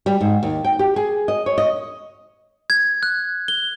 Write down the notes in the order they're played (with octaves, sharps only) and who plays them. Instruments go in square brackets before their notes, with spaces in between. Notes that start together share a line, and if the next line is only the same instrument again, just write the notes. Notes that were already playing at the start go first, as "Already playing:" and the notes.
[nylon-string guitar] G3
G#2
D#2
G5
G4
G#4
D#5
C#5
D#5
[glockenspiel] G#6
F#6
G7